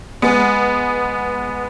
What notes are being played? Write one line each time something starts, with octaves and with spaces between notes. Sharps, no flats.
G#3 B3